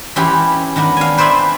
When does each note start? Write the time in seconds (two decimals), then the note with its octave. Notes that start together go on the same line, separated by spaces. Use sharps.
0.16 E3 C#4 G4 B5 C6
0.76 D#3 B3 D4
0.97 F5 G#5
1.17 B4 C5 D5 E5 G5 G#5